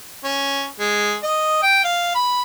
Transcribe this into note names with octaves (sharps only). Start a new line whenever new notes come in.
C#4
G#3
D#5
G5
F5
B5